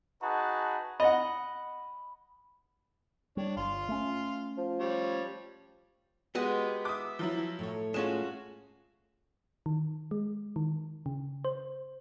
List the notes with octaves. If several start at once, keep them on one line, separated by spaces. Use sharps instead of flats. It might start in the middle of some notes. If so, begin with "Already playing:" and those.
D#4 F#4 G#4 B4 A5
D#5 F#5 B5
G3 D4 C#5
G1 F5 C6
A3 C#4
F3
G3 C#5
G#3 B3 F#4 G4 D#5
E5 D6 D#6
F3 F#3 E4
A2 A3 C#5
G#3 C#4 F4 F#4 E7
D#3
G#3
D#3
C#3
C5